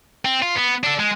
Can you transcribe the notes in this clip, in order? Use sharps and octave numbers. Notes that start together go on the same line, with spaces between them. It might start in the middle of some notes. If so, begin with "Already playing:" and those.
C4
F4
B3
D4 A4
G#3